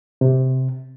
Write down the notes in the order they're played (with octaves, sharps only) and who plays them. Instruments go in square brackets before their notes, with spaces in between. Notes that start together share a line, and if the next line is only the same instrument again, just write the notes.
[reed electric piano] C3